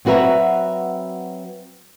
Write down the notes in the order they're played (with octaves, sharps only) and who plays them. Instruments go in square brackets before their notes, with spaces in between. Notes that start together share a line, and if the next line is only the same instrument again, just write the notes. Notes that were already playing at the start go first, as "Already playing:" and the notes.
[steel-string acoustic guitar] F#3 C4 F#4 B4 E5 A#5